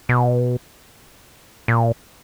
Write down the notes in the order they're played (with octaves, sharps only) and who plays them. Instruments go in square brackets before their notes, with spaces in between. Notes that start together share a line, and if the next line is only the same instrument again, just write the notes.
[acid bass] B2
A#2